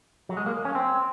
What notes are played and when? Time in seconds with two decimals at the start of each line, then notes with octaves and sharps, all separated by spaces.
0.29 F#3
0.37 G#3
0.46 A#3
0.65 C#4
0.75 C4